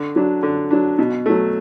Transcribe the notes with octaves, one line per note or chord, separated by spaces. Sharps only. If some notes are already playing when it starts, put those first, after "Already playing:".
Already playing: D3
F#3 D4
D3
F#3 D4
B2
F#3 A3